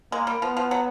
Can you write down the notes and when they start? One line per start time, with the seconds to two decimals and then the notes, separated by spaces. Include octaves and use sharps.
0.12 G#3 A#3
0.27 G3
0.42 F3 B3
0.57 F3
0.71 F#3